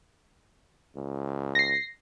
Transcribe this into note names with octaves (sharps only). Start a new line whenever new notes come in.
C#2
A#6 C7